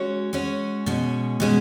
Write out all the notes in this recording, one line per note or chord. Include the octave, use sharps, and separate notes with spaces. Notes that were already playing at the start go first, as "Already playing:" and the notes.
Already playing: G#3 C#4 F#4 C#5
G#3 C#4 F#4 C#5
B2 G#3 C#4
B2 G#3 C#4